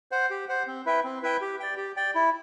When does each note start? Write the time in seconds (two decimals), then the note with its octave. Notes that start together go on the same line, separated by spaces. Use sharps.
0.11 C5 F#5
0.30 G4
0.49 C5 F#5
0.67 C4
0.86 E4 B4 E5 G5
1.04 C4
1.23 E4 B4 E5 G5
1.41 G4
1.60 D5 G5
1.77 G4
1.97 D5 G5
2.15 E4